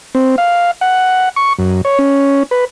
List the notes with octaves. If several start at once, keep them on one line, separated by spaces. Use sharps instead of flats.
C4
F5
F#5
C#6
F#2
C#5
C#4
B4